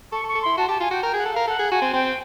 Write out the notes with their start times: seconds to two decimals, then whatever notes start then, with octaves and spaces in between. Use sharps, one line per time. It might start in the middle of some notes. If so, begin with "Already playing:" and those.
0.12 A4 C#6
0.24 A4
0.28 C#6
0.35 A4
0.42 E4 C6
0.57 F#4 A5
0.68 G4 A5
0.80 F4 G#5
0.91 F#4 G5
1.03 A#4 G5
1.14 G#4 F#5
1.26 A4
1.33 A#4 F5
1.48 A4 F#5
1.59 G#4
1.71 F#4 G#5
1.82 C4
1.93 C4 G5